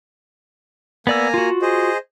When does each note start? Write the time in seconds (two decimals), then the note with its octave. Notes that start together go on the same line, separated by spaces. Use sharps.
1.07 A#3 B3 D5 G#5 A#5 E6
1.34 F4 F#4
1.62 G#4 C5 D#5